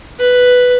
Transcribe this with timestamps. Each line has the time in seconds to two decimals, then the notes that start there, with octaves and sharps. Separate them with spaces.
0.20 B4